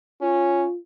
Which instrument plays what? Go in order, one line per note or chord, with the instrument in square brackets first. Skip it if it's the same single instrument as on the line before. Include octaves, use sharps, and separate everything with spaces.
[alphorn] C#4 [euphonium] F4